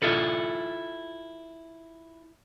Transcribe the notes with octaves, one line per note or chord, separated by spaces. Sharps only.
E4 F4 A4 B4